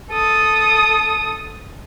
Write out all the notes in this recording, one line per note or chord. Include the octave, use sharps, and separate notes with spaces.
A4 D#6